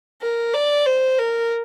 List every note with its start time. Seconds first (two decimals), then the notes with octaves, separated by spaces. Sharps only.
0.22 A#4
0.54 D5
0.86 C5
1.19 A#4